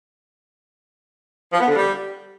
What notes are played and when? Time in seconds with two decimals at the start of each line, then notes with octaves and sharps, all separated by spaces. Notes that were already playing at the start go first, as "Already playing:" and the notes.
1.52 F3
1.60 B3
1.68 D3
1.76 G3